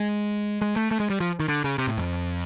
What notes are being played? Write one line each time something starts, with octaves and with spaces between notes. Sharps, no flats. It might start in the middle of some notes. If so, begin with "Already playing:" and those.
Already playing: G#3
G#3
A3
A3
G#3
G3
F3
D#3
D3
C#3
C3
A2
F2